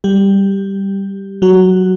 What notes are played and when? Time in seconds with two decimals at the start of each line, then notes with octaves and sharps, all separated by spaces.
0.04 G3 G4
1.42 F#3 F#4